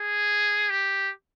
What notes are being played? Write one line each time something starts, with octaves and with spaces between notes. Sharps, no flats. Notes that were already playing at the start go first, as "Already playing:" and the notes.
Already playing: G#4
G4